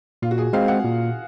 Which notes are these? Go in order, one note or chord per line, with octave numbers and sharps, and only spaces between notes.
A#2 F4
F#4
G#4
G#3 C4 F5
F#5
A#2